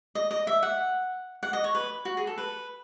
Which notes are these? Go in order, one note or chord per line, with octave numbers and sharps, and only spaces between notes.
D#5
D#5
E5
F#5
F#5
D#5
C#5
B4
F#4
G#4
A4
B4